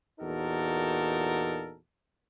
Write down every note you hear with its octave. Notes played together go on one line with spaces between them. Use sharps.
E2 A#2 D#4 F#4 A4 A#4